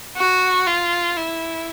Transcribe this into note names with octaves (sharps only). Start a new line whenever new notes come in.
F#4
F4
E4